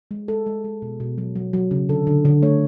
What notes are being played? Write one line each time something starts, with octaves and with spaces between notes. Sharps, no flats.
G#3
G#3 A4
G#3
G#3
B2
B2
F#3
F#3
F#3
C#3
D3 A4
D3
D3
A3 C#5